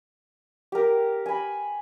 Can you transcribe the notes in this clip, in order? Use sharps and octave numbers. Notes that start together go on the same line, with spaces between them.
G4 A#4
G#5 B5